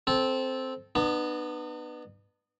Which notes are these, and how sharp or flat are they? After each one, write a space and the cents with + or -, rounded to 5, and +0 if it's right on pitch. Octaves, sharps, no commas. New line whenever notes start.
C4 +0 A4 -15
B3 +0 D4 +45